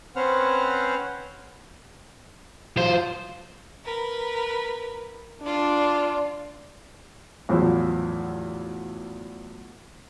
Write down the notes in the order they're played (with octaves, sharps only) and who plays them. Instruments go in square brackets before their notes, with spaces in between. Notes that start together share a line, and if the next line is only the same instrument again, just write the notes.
[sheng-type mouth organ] C4 C#4 B4 C5 F#5 F6
[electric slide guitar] F#3 F4 [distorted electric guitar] C5
[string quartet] A#4 B4
[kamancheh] D4 [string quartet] F4 D5
[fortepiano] E2 A2 F3 F#3